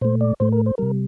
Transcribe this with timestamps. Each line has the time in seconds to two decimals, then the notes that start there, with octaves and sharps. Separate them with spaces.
0.01 A#2 A3 C5
0.21 D5
0.40 A2 A3 C5
0.52 A#4
0.66 C5
0.78 C3 G3 A#4